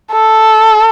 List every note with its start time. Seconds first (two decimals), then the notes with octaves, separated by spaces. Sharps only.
0.12 A4